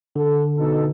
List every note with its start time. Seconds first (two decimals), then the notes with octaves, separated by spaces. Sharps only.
0.16 D3 A4
0.59 B2 D#4 A4